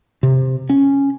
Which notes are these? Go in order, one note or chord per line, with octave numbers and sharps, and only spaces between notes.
C3
C#4